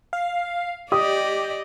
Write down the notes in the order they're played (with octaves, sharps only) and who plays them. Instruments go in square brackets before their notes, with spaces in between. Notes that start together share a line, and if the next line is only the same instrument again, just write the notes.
[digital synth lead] F5
[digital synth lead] G4 [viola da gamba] D5 D#5 [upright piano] D#6